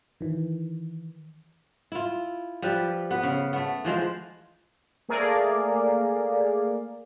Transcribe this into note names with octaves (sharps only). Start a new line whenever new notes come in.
D#3 E3
E4 F4
F3 G3 B4
B3 B4
C#3
A3 B3
E3 F3 G#3 C5
A3 A#3 G#4 A#4 D5 F5